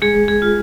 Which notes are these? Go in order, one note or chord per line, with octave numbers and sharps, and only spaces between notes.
G#3 G#4
G#4
F4